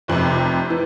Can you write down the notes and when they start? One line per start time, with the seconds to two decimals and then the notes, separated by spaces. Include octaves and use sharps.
0.08 F1 F2 C3
0.70 E3